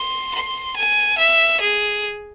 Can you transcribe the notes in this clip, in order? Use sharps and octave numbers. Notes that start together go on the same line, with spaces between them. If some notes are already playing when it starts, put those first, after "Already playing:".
Already playing: C6
C6
G#5
E5
G#4